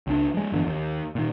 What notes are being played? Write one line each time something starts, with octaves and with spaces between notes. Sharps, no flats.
C#2 D4
F3 G#3
G1 E2 D3
D#2
A#2 D#3